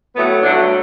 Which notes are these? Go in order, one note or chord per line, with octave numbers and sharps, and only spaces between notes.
A2 F#3 A3 B3
G2 D3 F#3 A3 D4